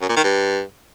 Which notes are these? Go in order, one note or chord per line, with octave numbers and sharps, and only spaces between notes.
F#2
A#2
D#3
G2